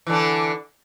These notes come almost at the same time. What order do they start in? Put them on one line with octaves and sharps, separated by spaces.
E3 D3 D4